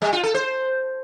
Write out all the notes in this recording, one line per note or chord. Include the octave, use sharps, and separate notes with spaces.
G3
F4
A4
C5